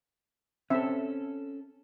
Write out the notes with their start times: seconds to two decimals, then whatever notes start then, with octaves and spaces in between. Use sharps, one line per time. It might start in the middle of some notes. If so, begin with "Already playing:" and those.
0.70 C4 C#4 A4 E5